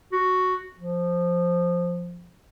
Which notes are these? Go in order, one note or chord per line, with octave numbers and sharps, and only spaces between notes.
F#4
F3